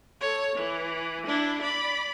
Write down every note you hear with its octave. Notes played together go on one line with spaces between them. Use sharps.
A4 C#5
E3
D4 E4
D5 B5